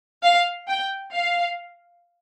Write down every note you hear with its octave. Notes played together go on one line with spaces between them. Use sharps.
F5
G5
F5